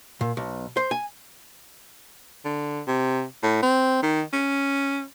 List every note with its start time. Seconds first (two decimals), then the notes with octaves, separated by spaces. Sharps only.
0.21 A#2
0.37 B1
0.77 C5
0.91 G#5
2.45 D3
2.88 C3
3.43 A2
3.63 C4
4.03 D#3
4.33 C#4